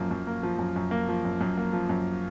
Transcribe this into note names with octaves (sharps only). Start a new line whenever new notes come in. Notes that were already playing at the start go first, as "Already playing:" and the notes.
Already playing: F#2 F3 A#3
F#2
A#3
F3
F#2
F#2
A#3
F3
F#2
F#2
A#3
F3
F#2